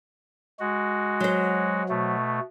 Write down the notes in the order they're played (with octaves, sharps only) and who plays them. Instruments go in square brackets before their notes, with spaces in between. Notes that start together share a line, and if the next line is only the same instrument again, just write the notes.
[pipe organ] G#3 F#4
[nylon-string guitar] F#3 C5
[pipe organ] B2 A3